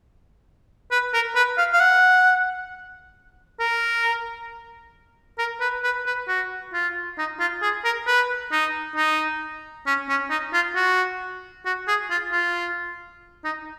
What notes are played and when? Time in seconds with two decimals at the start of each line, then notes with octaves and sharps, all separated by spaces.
0.92 B4
1.14 A#4
1.36 B4
1.58 F5
1.73 F5
1.81 F#5
3.60 A#4
5.39 A#4
5.61 B4
5.84 B4
6.06 B4
6.28 F#4
6.73 F4
7.18 D#4
7.40 F4
7.62 G#4
7.85 A#4
8.07 B4
8.52 D#4
8.96 D#4
9.87 C#4
10.09 C#4
10.30 D#4
10.54 F4
10.76 F#4
11.66 F#4
11.88 G#4
12.11 F4
12.32 F4
13.44 D#4